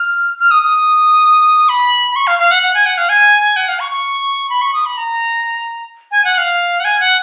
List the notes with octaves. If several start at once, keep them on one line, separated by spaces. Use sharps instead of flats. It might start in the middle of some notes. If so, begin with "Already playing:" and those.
Already playing: F6
F6
D#6
D#6
B5
B5
C#6
F5
F5
F#5
F#5
G#5
F#5
F5
G#5
F#5
F5
C#6
C#6
B5
C#6
D#6
B5
A#5
G#5
F#5
F5
F#5
G#5
F#5